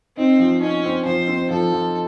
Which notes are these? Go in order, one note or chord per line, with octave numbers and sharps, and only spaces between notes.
C4 D#4
F3
C#4 D#4
C4
F3 C5
C4
F3 A4
F3